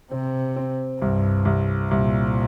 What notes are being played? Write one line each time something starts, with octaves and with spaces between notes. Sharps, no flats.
C3 C4
C4
C2 G2
C2
C2 A#2